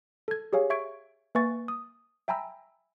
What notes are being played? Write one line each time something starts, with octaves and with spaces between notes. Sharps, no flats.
A4 G#6
G4 G#4 C#5 F5 G#5
E5 C#6 G#6 D7
A#3 B4 E5 G#5 C#6 A6
D#6
E5 G5 G#5 A#5 B5 E6